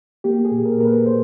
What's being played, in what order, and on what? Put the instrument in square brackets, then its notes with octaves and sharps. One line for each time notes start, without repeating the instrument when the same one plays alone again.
[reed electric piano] A#3 G4
G#4
A#2
A#4
A#3 A#4
B4
A#2 C5